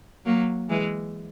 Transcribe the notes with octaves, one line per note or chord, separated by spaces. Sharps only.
F#3 A#3
E3 G#3